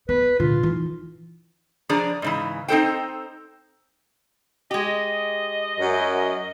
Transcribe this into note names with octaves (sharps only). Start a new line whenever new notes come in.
B3 B4
A#2 D3 F4
E3 D#4
F3 D4 G#4 D5 A#5
G#2 C#3 E3
C4 D#4 E4 A4 C5 G5
G#3 G4 D#5
F#2